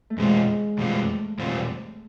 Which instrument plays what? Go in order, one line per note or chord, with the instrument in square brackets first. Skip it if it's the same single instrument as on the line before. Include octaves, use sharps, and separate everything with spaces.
[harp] A3
[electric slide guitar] E2 B2 G3 C4 F4 [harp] G#3
[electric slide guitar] E2 B2 G3 C4 F4 [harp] A3
[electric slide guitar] E2 B2 G3 C4 F4